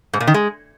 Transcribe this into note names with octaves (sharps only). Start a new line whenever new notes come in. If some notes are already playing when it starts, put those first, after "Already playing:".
G#2
A#2
D#3
G#3